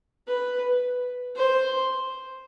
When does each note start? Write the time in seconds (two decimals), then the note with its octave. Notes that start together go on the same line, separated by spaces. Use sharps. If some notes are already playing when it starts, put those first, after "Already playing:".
0.28 B4
1.36 C5